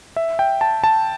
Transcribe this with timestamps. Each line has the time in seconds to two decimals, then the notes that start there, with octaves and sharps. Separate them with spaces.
0.16 E5
0.39 G5
0.61 A5
0.84 A5